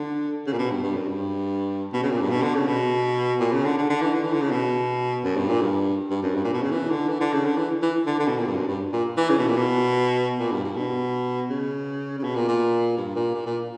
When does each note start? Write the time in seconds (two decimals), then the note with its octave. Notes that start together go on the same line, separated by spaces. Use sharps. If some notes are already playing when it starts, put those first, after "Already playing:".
Already playing: D3
0.46 C#3
0.53 A#2
0.58 B2
0.71 G2
0.82 G2
0.95 F#2
1.07 G2
1.93 B2
2.02 C#3
2.12 A#2
2.21 G2
2.30 B2
2.42 D3
2.55 C#3
2.67 B2
3.40 A#2
3.53 C#3
3.65 D3
3.78 D3
3.89 D3
4.02 E3
4.14 D3
4.23 E3
4.33 D3
4.41 C#3
4.51 B2
5.24 F#2
5.37 G2
5.49 A#2
5.61 G2
6.10 G2
6.23 F#2
6.35 G2
6.44 A#2
6.53 B2
6.62 C#3
6.71 E3
6.90 D3
7.08 E3
7.20 D3
7.33 C#3
7.45 D3
7.57 E3
7.82 E3
8.06 D3
8.19 D3
8.28 B2
8.37 A#2
8.46 G2
8.55 F#2
8.67 G2
8.92 A#2
9.17 E3
9.29 C#3
9.38 B2
9.47 A#2
9.56 B2
10.39 A#2
10.52 G2
10.64 G2
10.76 B2
11.49 C#3
12.19 C#3
12.23 B2
12.35 A#2
12.48 A#2
12.97 G2
13.16 A#2
13.34 A#2
13.46 A#2